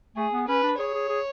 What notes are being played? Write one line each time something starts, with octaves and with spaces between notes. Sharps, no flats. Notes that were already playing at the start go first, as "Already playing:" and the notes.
A3 G#4
B3
C#4 B4
D4
G#4 C#5
G#4
G#4